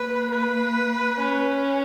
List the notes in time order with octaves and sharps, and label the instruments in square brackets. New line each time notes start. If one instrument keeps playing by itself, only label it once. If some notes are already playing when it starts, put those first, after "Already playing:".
Already playing: [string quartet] A#3 [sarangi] B4
[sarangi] B4
[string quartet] C#4